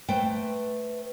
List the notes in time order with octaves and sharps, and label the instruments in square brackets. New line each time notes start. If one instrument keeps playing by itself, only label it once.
[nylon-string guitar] A3 B4 C5 G5